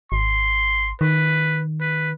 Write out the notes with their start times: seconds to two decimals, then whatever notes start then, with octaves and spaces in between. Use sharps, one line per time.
0.12 G#1 C6
1.01 D#3 B4
1.81 B4